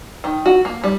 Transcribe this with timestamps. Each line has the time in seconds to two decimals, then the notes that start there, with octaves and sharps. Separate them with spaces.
0.24 D#3
0.46 F#4
0.65 A#3
0.84 G3